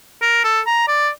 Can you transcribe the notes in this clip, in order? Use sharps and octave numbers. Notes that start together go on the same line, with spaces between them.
A#4
A4
A#5
D5